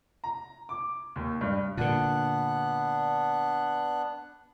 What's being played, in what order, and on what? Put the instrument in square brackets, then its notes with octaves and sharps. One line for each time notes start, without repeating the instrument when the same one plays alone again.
[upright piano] A#5
D6
D#2
G2
[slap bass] A#2 D3 [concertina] B3 D4 F#6